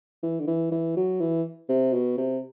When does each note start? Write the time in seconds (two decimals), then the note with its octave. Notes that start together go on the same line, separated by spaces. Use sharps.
0.23 E3
0.40 D3
0.47 E3
0.72 E3
0.97 F#3
1.21 E3
1.69 C3
1.93 B2
2.18 C3